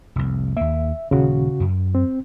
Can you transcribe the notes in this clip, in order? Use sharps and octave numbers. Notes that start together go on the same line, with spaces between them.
F1 C2
D#2 A#3 E5
D#1 C#3 F#4
F#2
C4